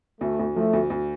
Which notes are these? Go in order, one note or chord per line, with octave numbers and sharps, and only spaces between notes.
D2 A3
D2
F3 A3
D2
D2